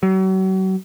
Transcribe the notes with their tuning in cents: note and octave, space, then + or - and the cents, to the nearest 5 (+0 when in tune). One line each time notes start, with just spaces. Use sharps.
F#3 +40